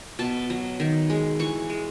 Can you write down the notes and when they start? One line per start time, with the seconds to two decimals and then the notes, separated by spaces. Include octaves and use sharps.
0.19 B2 A5
0.50 F#3
0.80 D#3
1.10 G#3
1.39 E3 C#6
1.70 G#3